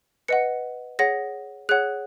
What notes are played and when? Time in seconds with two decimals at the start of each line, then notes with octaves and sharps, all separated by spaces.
0.28 B4 D#5 F#5 C#7
0.99 G#4 C#5 F#5 A#6
1.69 G#4 C#5 F#5 F#6